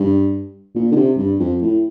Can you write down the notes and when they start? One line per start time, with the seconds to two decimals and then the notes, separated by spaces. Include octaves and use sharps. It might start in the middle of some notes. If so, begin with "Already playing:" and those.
Already playing: G2
0.75 A#2
0.92 D3
0.96 C3
1.18 G2
1.39 F2
1.62 A2